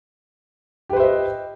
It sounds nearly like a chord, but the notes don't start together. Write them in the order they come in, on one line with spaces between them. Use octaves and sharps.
G4 B4 C5 E5 D#5